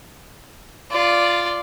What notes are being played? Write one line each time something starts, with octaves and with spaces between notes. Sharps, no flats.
F4 D5